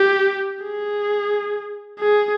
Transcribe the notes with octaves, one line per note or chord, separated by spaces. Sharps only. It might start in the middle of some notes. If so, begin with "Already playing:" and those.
Already playing: G4
G#4
G#4